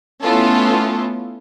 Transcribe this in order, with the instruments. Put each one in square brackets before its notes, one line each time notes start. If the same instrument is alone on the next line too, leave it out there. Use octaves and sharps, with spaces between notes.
[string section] A3 B3 C#4 E4 F4 A4